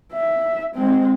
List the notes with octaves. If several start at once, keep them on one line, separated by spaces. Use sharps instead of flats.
E5
G#3 C4